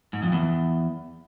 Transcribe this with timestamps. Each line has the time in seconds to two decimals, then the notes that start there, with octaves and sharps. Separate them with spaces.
0.13 G#2
0.23 F2
0.32 E2